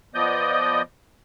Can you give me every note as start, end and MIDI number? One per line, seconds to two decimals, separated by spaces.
0.15 0.82 53
0.15 0.82 59
0.15 0.82 74
0.15 0.82 75
0.15 0.82 87
0.15 0.82 91